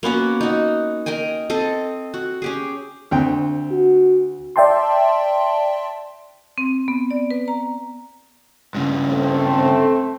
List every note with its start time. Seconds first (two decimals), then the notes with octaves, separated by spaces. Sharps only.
0.03 A#3 B3 C#4 F#4
0.41 D#4 F#4
1.06 A#4 D#5 G5 G#5
1.50 C4 A4 D#5
2.14 F#4
2.42 C#4 G4 G#4
3.11 D2 C4 G5
3.71 F#4
4.56 D5 E5 G5 A5 C6
6.58 C4
6.88 B3
7.11 D5
7.31 B4
7.48 A#5
8.75 G2 C#3
9.10 A3 C4